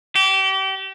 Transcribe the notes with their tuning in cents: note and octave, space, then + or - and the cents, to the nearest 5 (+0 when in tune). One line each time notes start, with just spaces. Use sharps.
G4 -30